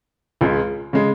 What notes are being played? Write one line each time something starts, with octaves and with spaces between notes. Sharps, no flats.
C#2 C#3 G#3
C#3 G#3